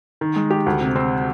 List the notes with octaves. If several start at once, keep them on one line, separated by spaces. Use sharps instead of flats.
D#3
G#3
G4
D2
C3
C4